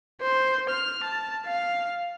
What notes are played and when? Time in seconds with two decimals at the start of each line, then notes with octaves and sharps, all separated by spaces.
0.21 C5
0.69 F6
1.04 A5
1.46 F5